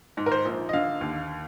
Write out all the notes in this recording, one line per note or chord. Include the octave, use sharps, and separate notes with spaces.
G#2
A#4
C5
A#1
D#5
D3 F5
D#2